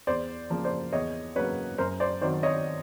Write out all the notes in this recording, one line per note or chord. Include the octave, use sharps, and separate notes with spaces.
E2 C5 D5
C#3 F3 A#3
C5 D5
E2 C#5 D#5
C#3 F#3 A#3 B4 C#5
F#2 A#4 C5
C5 D5
D#3 F#3 C5 D5
C#5 D#5